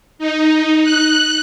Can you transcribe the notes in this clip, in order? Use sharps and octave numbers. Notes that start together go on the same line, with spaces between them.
D#4
F#6